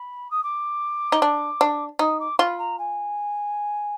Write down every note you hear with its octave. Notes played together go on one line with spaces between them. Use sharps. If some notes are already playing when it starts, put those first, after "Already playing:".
Already playing: B5
D#6
D6
D#4
D4
D4
D#4 D#6
D6
F4 B5
A#5
G#5